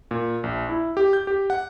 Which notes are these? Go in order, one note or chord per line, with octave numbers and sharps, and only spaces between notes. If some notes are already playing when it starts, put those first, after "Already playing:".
A#2
A#1
E4
G4
G6
G4
F#5